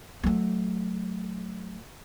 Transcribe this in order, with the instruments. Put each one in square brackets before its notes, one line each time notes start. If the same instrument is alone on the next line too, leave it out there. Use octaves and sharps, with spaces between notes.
[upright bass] F#3 A3